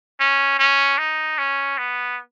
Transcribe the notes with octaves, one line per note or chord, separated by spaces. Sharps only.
C#4
C#4
D#4
C#4
B3